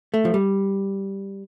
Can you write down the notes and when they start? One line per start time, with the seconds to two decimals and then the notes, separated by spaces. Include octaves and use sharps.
0.14 A3
0.25 F3
0.34 G3